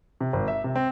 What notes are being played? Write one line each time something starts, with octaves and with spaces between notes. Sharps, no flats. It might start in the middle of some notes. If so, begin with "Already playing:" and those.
C3
G#1
E5
C3
C4